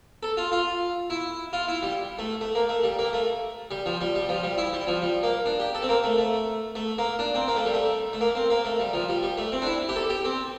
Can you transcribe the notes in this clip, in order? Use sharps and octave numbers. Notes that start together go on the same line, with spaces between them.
A4
F4
F4
E4
F4
E4
G3
A3
A3
A#3
A3
G3
A#3
A3
G3
F3
G3
G3
F3
G3
E4
G3
F3
G3
A#3
D4
G4
A4
C4
A#3
A3
A3
A3
A#3
D4
C4
A#3
A3
G3
A3
A3
A#3
C4
A#3
A3
G3
F3
G3
G3
A3
C4
D4
E4
G4
A4
G4
C4